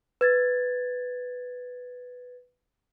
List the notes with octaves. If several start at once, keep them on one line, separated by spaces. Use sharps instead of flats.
B4 G#6 A6